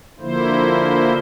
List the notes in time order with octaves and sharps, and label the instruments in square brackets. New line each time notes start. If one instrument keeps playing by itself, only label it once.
[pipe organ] D3 F3 A#3 E4 C5